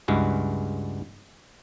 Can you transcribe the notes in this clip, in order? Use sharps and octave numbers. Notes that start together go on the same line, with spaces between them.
C#2 G2 G#3 E4 F#4